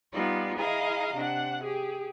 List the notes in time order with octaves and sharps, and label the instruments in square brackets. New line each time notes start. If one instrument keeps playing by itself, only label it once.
[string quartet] G3 B3 D#4 F4 D5
E4 G#4 D#5 F5 G#5 A#5
C3 D4 F#5
G4 G#4